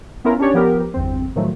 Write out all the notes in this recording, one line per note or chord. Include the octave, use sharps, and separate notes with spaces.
B3 C#4 E4 F4 A#4
C#4 D4 G4 C#5 D5
F3 B3 G4 A#4
G1 E2 C4
A2 D#3 F3 F#3 A3